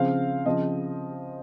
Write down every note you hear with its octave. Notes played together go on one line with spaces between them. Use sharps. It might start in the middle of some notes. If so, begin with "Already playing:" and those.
Already playing: C#3 F3 C4 F5
C#3 F3 C4 D#5